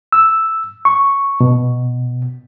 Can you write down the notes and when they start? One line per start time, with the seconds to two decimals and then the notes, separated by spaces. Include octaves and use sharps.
0.13 E6
0.85 C#6
1.41 B2